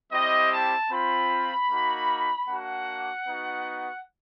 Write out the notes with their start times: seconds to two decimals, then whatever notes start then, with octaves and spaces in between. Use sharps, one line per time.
0.11 G3 C4 E4 G4 D#5
0.50 A5
0.90 C4 F4 B5
1.69 A#3 D#4 F#4
2.47 A#3 D4 F#4 F#5
3.27 B3 D#4 F#4